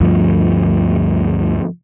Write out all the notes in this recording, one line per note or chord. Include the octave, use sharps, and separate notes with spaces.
D2 G2 F3